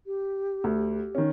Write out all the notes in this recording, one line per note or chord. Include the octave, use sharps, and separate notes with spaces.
G4
D2
D#3 C#4